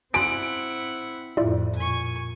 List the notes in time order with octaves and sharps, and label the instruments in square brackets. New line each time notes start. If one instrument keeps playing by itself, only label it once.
[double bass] C4 [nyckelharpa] E4 F#5 [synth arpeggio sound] G#5 C6 [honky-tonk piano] D7
[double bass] F2 A2 [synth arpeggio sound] E4 F4 D5
[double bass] A#2 [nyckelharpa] G#5 C#6